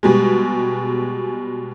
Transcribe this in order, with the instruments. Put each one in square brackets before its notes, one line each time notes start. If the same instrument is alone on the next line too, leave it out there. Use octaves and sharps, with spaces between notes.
[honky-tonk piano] B2 G3 G#3